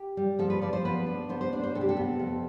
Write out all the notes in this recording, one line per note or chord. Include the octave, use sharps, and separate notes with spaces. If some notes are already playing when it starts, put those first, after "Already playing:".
Already playing: G4
G3
F3 A4
B4
F3 D5
C5
B3 B4
D4
B3 C5
C5
D4 C5
C5
C3 A4
G4
A4
B3
F2